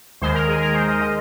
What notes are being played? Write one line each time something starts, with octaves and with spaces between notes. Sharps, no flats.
D#2 D#3 G#3 C5
A#4
G#4
A#4
C5
D#5
D#3 G#3 D#5